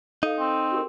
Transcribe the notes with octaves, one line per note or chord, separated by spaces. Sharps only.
D#4 A4 F5
C4
F#4 G4 A#4